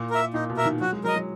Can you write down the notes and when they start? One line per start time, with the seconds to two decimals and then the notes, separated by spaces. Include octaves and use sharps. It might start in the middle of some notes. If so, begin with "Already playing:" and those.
Already playing: A#2
0.10 A#4 E5
0.34 A#2 D#4
0.50 B2
0.57 A#4 E5
0.65 D#3
0.81 F#3 F#4
0.92 G#3
1.04 F#3 A#4
1.08 D#5
1.16 F#3